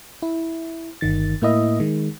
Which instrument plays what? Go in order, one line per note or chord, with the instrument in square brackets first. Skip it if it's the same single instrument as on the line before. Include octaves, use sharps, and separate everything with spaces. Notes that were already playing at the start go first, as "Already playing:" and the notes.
[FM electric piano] E4
G1 D#3 A6
A2 A#3 E4 D#5 E5
D#3 G#3